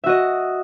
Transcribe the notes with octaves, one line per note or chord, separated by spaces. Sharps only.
F#4 D#5 E5